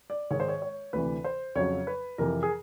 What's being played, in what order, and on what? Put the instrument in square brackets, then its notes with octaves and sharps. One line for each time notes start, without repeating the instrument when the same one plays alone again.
[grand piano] D5
G#2 D#3 G#3 C#5
C5
C#5
C#5
D2 C3 E3 B4
C5
F2 C#3 F#3 C#5
B4
F2 C3 E3 A#4
G#4